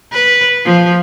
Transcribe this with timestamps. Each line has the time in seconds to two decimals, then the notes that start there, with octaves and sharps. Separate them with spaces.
0.13 B4
0.65 F3